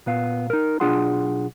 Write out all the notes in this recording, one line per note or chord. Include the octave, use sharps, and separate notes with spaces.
A#2 B3 F5
D#4 A#4
B1 D4 F4 G#4 F#5 C6